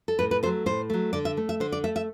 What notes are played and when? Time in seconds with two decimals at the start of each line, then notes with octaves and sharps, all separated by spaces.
0.08 A4
0.19 A2 B4
0.31 B4
0.43 F#3 A3 C5
0.66 A2 C5
0.90 F#3 A3
1.13 D3 D5
1.25 E5
1.37 A3
1.49 E5
1.60 D3 C5
1.72 D5
1.84 A3 E5
1.96 E5